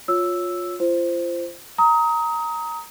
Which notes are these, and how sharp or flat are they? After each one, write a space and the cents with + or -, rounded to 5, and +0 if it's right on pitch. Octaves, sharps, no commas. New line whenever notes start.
F4 +20 C#5 +0 E6 +0
F4 -35 C5 +0
A#5 +0 D#6 +25